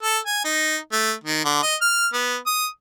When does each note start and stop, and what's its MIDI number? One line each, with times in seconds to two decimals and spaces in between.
0.03 0.18 69
0.26 0.43 80
0.45 0.78 63
0.92 1.13 57
1.24 1.44 51
1.45 1.61 50
1.63 1.75 75
1.81 2.08 89
2.13 2.37 59
2.46 2.67 87